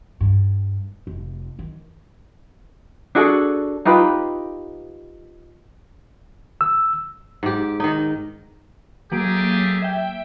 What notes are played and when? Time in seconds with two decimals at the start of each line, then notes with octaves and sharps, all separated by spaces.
0.20 G2
1.07 F1
1.59 D#3
3.15 D4 F#4 G#4 A4
3.85 D#4 F4 G4 B4
6.61 E6
7.43 G#2 G4
7.80 D#3 D#4
9.12 F#3 A3 A#3 G4 G#4 D7
9.82 E5 G5